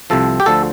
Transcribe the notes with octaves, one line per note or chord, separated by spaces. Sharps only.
C2 C3 F3 A4
G4
D2 D3 F3 A4